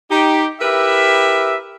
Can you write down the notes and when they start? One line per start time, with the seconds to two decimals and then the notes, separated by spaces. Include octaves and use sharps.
0.11 D#4 G4
0.61 E4 G4 A#4 B4 E5